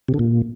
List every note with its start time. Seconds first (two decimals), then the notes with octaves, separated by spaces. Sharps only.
0.08 C3
0.14 D3
0.19 A#2